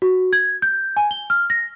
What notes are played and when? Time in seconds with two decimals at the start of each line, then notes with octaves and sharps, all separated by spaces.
0.02 F#4
0.33 G#6
0.62 G6
0.97 G#5
1.11 G7
1.30 F6
1.50 A#6